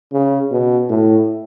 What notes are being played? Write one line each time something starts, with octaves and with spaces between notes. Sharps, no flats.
C#3
B2
A2